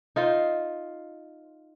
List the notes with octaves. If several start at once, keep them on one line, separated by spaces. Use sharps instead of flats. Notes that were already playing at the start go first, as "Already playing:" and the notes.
D#4 F4 C5